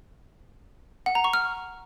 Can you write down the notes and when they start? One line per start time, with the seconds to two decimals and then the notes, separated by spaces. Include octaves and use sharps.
1.06 F#5
1.15 A#5
1.24 C#6
1.33 F6